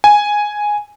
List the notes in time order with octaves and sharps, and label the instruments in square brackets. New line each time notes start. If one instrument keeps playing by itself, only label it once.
[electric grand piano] G#5